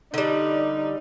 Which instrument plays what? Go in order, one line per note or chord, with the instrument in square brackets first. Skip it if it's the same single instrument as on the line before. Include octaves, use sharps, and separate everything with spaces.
[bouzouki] D3 G3 [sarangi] D#4